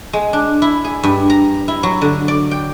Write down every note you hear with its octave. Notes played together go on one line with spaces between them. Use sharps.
G#3
D4
E4
G#4
G2
A#5
E4
F#3
D3
D5
G5